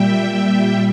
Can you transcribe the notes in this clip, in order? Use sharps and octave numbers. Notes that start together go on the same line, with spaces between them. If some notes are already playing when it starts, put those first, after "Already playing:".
Already playing: A#2 G3 E5 G5